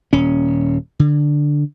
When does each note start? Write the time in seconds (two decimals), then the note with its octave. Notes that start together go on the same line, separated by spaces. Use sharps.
0.13 D#1 C#4
0.99 D3